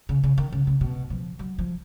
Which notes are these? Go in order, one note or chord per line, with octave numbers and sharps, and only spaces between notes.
C#3
C#3
D#3
C#3
C#3
B2
F3
F#3
F3